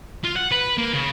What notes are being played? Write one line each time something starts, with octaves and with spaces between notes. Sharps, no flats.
F4
F#5
B4
A#3
C#3